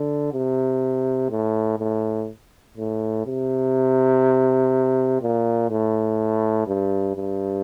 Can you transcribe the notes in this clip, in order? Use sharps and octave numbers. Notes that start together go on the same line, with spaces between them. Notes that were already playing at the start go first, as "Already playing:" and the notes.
Already playing: D3
C3
A2
A2
A2
C3
A#2
A2
G2
G2